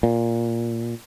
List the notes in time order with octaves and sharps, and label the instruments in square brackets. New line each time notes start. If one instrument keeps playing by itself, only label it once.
[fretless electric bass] A#2